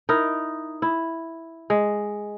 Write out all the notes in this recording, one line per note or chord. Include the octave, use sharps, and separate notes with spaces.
D#4 E4 A#4
E4
G#3